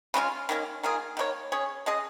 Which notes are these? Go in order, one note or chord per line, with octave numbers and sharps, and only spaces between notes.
C#3 G#3 C#4 F4
D#3 A#3 C#4
D#3 A#3 F4 G#4
D#3 A#3 F4 C#5
C#4 G#4 C#5
G#3 C#4 G#4 D#5